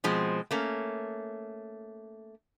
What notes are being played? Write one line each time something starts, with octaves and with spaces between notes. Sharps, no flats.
B2 F3 G#3 C4
A3 A#3 C#4